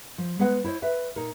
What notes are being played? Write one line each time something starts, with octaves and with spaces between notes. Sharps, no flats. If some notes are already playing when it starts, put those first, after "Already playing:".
F3
G#3 B3 B4 D#5 F#5
E4 C5 C#5 D#5
B4 E5
A#2 D#4 A#4